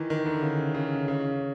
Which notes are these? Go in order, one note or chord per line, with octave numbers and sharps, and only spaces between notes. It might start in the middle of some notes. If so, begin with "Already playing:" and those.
Already playing: D#3 E3
D#3
D3
C#3
C#3
C#3